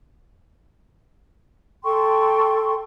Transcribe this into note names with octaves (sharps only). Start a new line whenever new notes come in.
A4 G5 C6 C#6